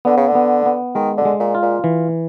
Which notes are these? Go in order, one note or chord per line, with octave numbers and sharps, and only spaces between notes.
D3 B3
C#3
D3
B3
B3
D#3 G#3
D3
G#3
A#2
F4
A#2
E3